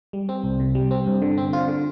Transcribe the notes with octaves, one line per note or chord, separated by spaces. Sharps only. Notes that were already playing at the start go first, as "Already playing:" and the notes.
G3
C4
C2
C3
G3
C4
G2
D3
C4
F4
D3